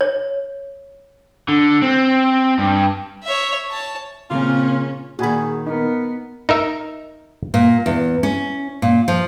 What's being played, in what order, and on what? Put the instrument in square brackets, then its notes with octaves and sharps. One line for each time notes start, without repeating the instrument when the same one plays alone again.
[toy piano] C#5
[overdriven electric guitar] D3
C4
G2
[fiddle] C#5 E5
C#5 A5
[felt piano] A#2 C#3 [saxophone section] A#3 F4 [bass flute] C4 [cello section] C#4
[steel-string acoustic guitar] A#2 D#3 [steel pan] F#4 G#5 B5 [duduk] G#4
[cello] B3 [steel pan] D#4 [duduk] A#4
[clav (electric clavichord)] D#4 A#4 E5
[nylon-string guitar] A#2
E2
C#4
A#2
F3